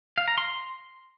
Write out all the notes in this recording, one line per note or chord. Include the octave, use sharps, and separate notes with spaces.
F5
A#5
C6